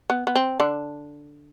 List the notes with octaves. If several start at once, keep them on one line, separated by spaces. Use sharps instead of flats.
B3
B3
C4
D3 D4